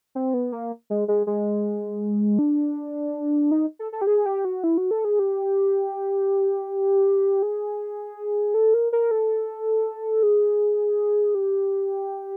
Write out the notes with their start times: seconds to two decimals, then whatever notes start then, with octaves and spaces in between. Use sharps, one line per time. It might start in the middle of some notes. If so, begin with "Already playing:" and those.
0.15 C4
0.34 B3
0.52 A#3
0.90 G#3
1.08 G#3
1.27 G#3
2.39 D4
3.51 D#4
3.79 A4
3.92 A4
4.01 G4
4.07 G#4
4.26 G4
4.45 F#4
4.64 E4
4.77 F#4
4.91 A4
5.05 G#4
5.19 G4
7.42 G#4
8.54 A4
8.74 A#4
8.92 A#4
9.11 A4
10.23 G#4
11.35 G4